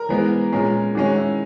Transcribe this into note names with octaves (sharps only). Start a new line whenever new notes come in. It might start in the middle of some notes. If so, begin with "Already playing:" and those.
Already playing: A#4
E3 G#3 B3
A#2 G#3 C#4
D#3 G#3 C#4 F#4
E4